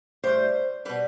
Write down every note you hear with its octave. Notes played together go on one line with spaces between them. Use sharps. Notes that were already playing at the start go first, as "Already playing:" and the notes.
A2 G3 C5
B2 G3 B4